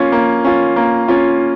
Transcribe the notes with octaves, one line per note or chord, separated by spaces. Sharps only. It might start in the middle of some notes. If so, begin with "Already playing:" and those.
Already playing: A#3 C#4 F4
A#3
C#4 F4
A#3
C#4 F4